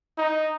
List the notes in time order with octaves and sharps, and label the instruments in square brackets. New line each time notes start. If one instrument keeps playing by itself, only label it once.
[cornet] D#4